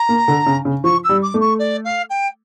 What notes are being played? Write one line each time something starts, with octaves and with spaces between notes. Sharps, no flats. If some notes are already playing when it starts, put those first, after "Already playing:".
Already playing: A#5
A#3
D3
C#3
C#3
F3 C#6
E6
G3
D6
A3
C#6
D5
F5
G5